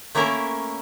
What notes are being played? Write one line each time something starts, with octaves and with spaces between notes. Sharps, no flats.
A3 A#3 C#4 E4 A#4